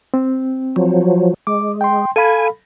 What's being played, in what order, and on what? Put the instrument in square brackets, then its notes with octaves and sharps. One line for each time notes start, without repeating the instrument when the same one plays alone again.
[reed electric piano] C4
[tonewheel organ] F3 F#3
[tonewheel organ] G#3 [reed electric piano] D6
[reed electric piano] G5 C6
[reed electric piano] A4 F5 B5 [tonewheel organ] G#5